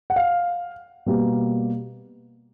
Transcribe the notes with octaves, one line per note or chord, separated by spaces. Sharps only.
F#5
F5
B2 G3 A#3